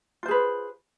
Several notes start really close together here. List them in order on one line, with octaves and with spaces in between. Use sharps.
F4 C5 G#4 B4